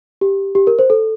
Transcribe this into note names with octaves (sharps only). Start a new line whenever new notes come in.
G4
G4
A#4
C5
A4